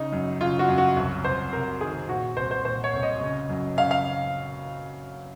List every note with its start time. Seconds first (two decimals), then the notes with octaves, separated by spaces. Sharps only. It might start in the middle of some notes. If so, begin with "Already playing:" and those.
Already playing: C#3 D#4
0.12 F#2
0.41 C#3 F4
0.59 F#4
0.68 F#2
0.78 F#4
0.96 C2
1.24 C2 C5
1.52 C3 A#4
1.81 D#3 G#4
2.09 A#2 F#4
2.37 C2 C5
2.51 C5
2.65 A#2 C5
2.84 C#5
2.93 C2
3.03 D#5
3.21 C#3
3.49 F#2
3.77 C#3 F5
3.91 F5